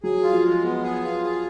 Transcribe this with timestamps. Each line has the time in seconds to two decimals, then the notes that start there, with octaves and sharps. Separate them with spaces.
0.03 F#3 G#4
0.24 F4
0.33 F3
0.43 G#3
0.63 B3
0.83 G#4
1.03 F4
1.23 G#4